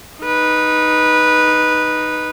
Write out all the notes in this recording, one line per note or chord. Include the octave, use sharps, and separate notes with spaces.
D#4 B4